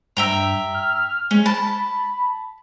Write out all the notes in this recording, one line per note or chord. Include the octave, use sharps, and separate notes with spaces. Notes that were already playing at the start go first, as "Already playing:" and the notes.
G2 E5 G5 A#5
F6
G#3 C#4
A5 B5